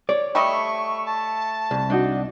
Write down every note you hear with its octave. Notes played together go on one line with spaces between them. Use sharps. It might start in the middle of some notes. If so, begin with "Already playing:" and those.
C#5 D5
G3 A3 D#5 C#6
A5
C2
D4 D#4 F#4